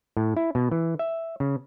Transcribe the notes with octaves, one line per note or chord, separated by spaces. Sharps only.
A2
E4
B2
E3
E5
C#3